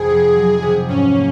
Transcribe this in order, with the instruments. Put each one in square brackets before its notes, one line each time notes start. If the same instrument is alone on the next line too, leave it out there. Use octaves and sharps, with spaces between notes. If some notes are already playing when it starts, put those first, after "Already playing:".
Already playing: [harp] F2 C3 [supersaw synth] G#4
[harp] F1
F#3
C3
[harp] G#2 [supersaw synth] C#4
[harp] A#3